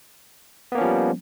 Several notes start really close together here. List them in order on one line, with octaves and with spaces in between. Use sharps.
B3 A#3 C#4 F3 G3